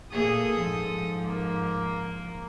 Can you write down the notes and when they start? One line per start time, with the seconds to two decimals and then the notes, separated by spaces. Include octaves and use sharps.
0.12 A#2 A#3 G#4 A4 D#6
0.56 G#2 F3
1.26 A#3